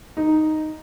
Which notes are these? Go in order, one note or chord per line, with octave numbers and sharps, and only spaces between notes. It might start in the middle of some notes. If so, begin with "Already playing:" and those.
D#4